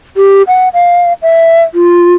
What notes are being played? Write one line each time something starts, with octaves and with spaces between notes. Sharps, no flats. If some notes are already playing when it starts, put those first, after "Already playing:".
G4
F#5
F5
E5
F4